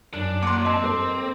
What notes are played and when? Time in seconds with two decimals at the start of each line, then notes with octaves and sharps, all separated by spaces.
0.14 F#2 D4
0.43 F#3 A#3 D5 C6 D6
0.65 C4 D#5 A5
0.82 A#3 A4 C5